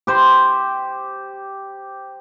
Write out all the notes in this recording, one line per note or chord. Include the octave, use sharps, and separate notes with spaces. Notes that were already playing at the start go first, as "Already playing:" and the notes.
G4 C5